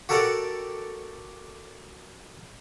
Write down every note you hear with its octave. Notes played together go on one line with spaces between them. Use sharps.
F#4 G4 A4 A#4 D5 F#5